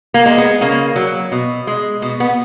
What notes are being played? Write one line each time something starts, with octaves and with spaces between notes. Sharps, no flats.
A#3
G#3
B3
C#3 A#3
F#3
B2
G#3
B2
B3